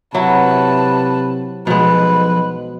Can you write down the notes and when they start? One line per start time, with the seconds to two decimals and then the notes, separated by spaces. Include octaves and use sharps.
0.14 C3 F#3 E4 B4 A5
1.67 B1 B2 F3 G#3 B4